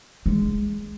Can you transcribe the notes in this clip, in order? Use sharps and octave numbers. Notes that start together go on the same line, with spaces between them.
G#3